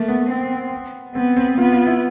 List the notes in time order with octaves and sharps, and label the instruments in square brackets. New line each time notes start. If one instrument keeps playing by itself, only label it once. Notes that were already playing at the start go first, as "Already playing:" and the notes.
Already playing: [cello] A3 [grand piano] A#3
[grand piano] B3
[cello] C4
[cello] B3 [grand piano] C4
[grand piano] C4
[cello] B3 [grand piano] F4
[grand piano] F4
E4